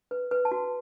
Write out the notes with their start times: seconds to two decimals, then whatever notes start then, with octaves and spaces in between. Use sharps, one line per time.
0.11 B4
0.31 B4
0.45 A5
0.52 F#4